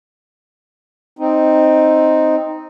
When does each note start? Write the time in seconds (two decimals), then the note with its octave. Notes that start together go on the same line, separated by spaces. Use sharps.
1.19 C4 D#4